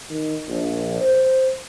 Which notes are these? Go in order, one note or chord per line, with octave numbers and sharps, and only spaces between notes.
D#3
A#1
C5